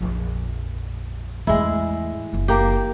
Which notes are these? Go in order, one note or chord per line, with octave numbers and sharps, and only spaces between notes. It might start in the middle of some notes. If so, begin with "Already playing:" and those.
A#1 F2
E2 A2 G#3 E4
F#1 F3
A#3 G4